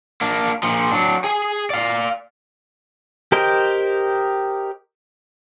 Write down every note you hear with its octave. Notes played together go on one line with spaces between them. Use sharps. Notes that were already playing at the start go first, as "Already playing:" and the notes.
A#3 D4
A#2 F3
F#3 D4
G#4 G#5
D5 F5
G4 A#4 C5 D#5 G5